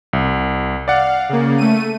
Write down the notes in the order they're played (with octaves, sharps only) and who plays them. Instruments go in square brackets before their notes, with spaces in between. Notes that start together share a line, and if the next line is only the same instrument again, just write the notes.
[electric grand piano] C2
[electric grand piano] D5 F#5 [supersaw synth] F5
[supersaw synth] C#3 A#3
A3 D#7